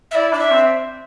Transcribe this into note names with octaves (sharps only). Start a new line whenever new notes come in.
E5
E4 D5
D4 D5
E5
C4